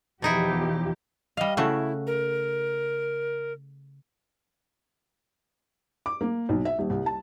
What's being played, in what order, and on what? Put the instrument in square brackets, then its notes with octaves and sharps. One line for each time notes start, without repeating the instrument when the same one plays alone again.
[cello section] E2 F3 G4 [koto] B2 D#4 E4
[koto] G3 F5 [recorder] D#5
[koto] C#3 A3 F#4 [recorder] E4
[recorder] A#4
[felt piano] D6
A#3
B1
E5
D#1
C2
A5